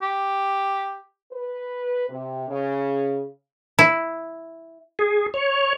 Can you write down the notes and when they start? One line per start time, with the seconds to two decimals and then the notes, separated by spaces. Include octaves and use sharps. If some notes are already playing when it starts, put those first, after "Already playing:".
0.02 G4
1.32 B4
2.09 C3
2.48 C#3
3.79 E4
4.99 G#4
5.34 C#5